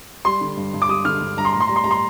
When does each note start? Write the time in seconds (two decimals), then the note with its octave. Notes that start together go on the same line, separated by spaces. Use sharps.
0.25 G3 C6
0.41 D3
0.57 G2
0.73 G2
0.82 D6
0.89 G3 D#6
1.05 D3 F6
1.22 G2
1.37 G2 A#5
1.45 C6
1.53 A2 A#5
1.60 C6
1.67 G3 A#5
1.76 C6
1.84 G3 A#5
1.91 C6